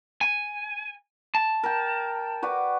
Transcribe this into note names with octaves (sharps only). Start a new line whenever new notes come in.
G#5
A5
A#4 G5
F#4 B4 D5